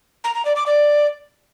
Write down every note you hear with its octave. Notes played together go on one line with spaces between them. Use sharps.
A#5
A#5
D5
D6
D5